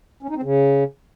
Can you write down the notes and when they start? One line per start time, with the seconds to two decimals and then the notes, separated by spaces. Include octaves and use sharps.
0.23 C#4
0.29 D#4
0.36 C4
0.43 C#3